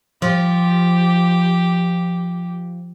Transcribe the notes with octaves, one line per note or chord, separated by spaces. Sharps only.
F3 G4